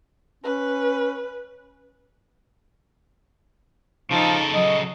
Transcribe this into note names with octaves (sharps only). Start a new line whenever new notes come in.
C#4 B4
C#3 F3 D#4 A4
F#3 D#5